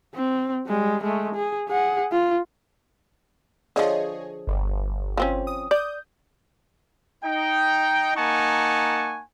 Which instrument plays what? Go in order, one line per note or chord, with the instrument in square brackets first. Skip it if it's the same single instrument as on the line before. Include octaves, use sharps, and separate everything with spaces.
[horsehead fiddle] C4
G3 G#3
G#3 A3
G#4
G#4 F#5
F4
[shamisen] D3 F3 [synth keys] G#4 C#5 D#5
[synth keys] G1
[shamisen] F3 C4 C#4
[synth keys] D#6
[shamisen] D5 [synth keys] D#6 G6
[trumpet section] D#4 G5
A#3 D#4 F#5 G#5 A5 C#6